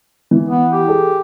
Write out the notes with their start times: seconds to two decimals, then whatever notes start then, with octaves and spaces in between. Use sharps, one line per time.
0.31 E3
0.49 B3
0.72 G4
0.88 G#4 A4